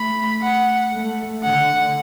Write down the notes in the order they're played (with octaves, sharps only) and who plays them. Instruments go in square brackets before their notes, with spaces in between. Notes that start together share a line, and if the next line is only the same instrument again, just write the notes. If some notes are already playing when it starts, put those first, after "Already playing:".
Already playing: [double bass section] A3 [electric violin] B5
[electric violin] F#5
[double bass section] A3
[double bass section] D3 [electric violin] F#5